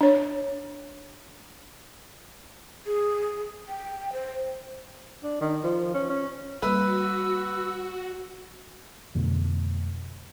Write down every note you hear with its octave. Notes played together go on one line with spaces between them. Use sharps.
D4 C#5
G#4
G5
C5
D4
D#3
F3
C#4
C#4
G3 A#3 F#4 B4 E6
F2 B2 D3 A3